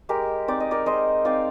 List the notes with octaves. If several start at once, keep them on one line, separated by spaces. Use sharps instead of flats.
G#3 G4 A#4
C4 D#4 D5
D#5
A#4 D5
G#3 C5 D#5
C4 D#4 D5 F5